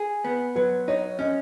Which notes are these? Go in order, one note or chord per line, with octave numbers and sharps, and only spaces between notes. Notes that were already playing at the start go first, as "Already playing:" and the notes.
Already playing: G#4
B3
F#3 B4
D#4 C#5
C#4 D#5